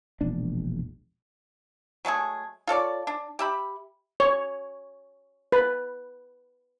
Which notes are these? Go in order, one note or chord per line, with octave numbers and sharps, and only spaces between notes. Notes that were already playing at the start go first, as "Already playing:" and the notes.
E1 A#1 D4
F#3 G#3 A3 G#4
F4 A4 C#5 D5
D4
G4 E5 B5
C#5
B4